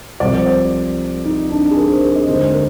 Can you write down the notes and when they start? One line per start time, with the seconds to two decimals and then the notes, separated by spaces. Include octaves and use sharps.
0.20 C2 C3 F3 D5
0.34 C5
0.47 D5
1.25 D#4
1.50 D4
1.71 G#4
1.76 A#4
1.89 C5
2.02 G#4
2.15 D#5
2.27 D#2 D3 G#3 C5
2.54 A#4